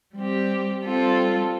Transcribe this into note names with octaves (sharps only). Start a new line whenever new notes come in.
G3 C4 G4
G3 C4 F4 A4